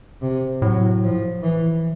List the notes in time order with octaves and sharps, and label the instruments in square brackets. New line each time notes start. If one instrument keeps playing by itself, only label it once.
[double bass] C3
[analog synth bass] A2 [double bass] F#3
[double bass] F3
E3